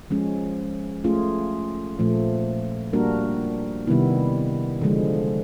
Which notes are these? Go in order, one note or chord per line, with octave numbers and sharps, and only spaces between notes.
F3 G#3 C#4
A3 C#4 F4 G#4
A#2 F3 A3
G3 A#3 D4 F#4 A#4
C3 D#3 G3 B3 E4
D3 F3 G#3